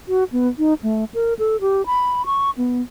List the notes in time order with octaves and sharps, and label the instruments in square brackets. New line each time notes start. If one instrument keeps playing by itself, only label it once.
[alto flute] F#4
B3
D#4
A3
A#4
A4
G4
B5
C#6
B3